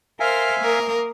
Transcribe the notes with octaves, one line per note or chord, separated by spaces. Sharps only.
A#4 C5 E5 F5 G#5 F6
A#3 A#4 D#6